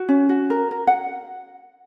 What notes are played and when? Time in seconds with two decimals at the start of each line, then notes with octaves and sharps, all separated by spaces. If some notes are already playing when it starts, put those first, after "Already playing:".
Already playing: F#4
0.09 C#4
0.29 F#4
0.50 A#4
0.71 A#4
0.87 F#5